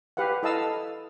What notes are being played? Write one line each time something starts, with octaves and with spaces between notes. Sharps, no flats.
G4 B4 F5 F#5
E4 A4 D#5 F5 A5 E6